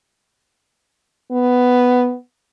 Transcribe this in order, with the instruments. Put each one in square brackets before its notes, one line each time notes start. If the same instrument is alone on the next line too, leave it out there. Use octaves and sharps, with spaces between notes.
[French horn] B3